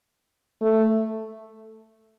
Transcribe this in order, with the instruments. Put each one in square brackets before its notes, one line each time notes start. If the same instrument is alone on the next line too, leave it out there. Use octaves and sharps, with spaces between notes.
[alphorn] A3